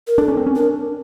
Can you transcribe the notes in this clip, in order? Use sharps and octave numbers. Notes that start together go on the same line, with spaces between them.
A#4
D4 A4
C#4
C4
C#4
D4 A#4